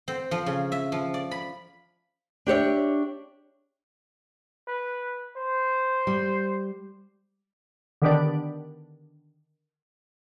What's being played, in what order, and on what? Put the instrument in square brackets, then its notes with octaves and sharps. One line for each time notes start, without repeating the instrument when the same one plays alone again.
[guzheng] C4
F3
C#3
E5
F3
D5
B5
[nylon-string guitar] D4 G4 C#5 E5
[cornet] B4
C5
[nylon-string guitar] G3
[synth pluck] D3 D#3 B3 D4 G4 D5